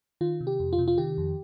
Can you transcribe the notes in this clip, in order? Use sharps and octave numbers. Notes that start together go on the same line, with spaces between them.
D#3 F4
C3
G4
F2
F4
C3
F4
D#3 G4
F2